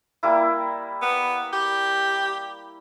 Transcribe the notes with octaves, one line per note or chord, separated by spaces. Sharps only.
G3 A#3 E4
B3
G4